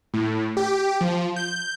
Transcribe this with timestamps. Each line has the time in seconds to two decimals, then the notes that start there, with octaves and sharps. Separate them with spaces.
0.14 A2
0.57 G4
1.01 F3
1.36 G6